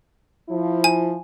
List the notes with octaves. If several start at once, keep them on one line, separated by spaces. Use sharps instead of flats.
F3 E4
G#5